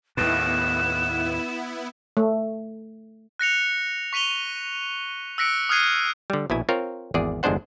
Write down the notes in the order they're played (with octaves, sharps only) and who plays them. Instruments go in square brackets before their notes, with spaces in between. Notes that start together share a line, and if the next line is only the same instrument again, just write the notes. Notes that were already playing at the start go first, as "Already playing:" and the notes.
[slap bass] D#2 A2 [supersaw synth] B3 E4 [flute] F#6 [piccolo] E7
[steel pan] A3
[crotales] F#6 A#6 C#7 F7
C#6 B6 D#7 F7 G7
E6 F#6 A#6 B6 C#7 D7
D#6 F6 F#6 G#6 C7 D#7
[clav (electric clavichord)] D3 G3
A#1 B2 E4 G#5
C4 F4 A#4 C#5
G#1 E2 G#4 D5
G1 E2 G#3 D4 C5 F#5